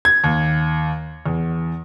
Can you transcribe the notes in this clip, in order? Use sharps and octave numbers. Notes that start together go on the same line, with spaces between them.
G#6
D#2
E2